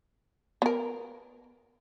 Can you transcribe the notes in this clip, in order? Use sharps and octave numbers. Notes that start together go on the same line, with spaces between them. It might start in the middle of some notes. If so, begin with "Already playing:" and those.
B3 A#4